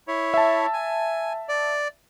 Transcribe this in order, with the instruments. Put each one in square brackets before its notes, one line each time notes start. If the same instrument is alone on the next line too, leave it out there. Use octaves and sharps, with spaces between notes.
[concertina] E4 C#5
[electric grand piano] E5 A5
[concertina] G#5
D5